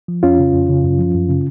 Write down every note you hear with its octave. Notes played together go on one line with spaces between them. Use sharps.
F3
F2 C#4 F4
C#3
F2
C#3
F#2
F3
F#2
C#3